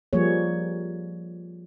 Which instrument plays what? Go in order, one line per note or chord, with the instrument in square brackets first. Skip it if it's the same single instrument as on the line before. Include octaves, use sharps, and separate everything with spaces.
[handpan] F3 G3 A#3 G#4 C#5